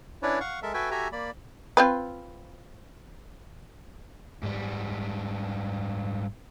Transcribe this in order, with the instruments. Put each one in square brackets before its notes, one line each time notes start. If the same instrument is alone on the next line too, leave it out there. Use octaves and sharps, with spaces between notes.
[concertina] C#4 D4 E4 B4 C#5 D5
F5 F#5 C#6
G#3 A4 A#4 E5
F#4 A4 B4 E5 G5 G#5
F#4 G4 A4 E5 G#5 A#5
A#3 D5 B5
[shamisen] C4 F4 B4
[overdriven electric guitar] G#2 G3